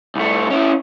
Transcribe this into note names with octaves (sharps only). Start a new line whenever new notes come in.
C2 A3
C#4 E4